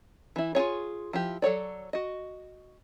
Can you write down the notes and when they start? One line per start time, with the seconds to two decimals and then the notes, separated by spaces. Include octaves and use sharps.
0.36 E3 E4
0.55 F4 F#4 G#4 C#5
1.13 F3 E4 G4
1.42 F#3 A4 C#5 D5
1.93 F#4 D#5